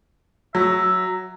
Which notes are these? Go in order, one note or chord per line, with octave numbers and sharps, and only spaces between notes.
F#3 E5